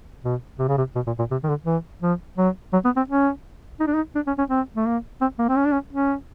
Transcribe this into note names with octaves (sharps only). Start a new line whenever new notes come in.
B2
C3
C#3
C3
B2
A#2
A#2
C3
D#3
D3
E3
F3
F#3
F#3
B3
C4
C#4
D#4
D4
D#4
D4
C#4
C#4
C4
A3
A#3
C4
A#3
C4
C#4
D4
C#4
C#4